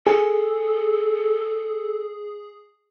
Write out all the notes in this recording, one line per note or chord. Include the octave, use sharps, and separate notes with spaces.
G#4 A4